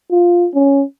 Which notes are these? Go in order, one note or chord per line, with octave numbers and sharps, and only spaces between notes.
F4
C#4